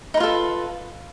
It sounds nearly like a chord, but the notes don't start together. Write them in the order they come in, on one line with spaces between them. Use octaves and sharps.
D#4 B4 F4 A4